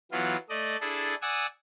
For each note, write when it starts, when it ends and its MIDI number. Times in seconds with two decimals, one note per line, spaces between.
0.12 0.36 52
0.12 0.36 54
0.12 0.36 59
0.12 0.36 65
0.49 0.77 57
0.49 0.77 74
0.49 0.77 75
0.81 1.15 62
0.81 1.15 64
0.81 1.15 68
0.81 1.15 69
1.22 1.47 74
1.22 1.47 78
1.22 1.47 80
1.22 1.47 87
1.22 1.47 88